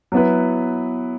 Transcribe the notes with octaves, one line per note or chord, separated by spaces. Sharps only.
F#3 B3 E4 B4